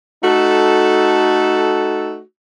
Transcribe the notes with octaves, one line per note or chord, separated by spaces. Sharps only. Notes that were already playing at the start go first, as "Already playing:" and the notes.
A3 D#4 F#4 A4